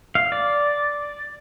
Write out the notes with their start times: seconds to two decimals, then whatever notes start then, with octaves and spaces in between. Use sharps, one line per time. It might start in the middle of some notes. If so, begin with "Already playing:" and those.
0.15 F5
0.32 D5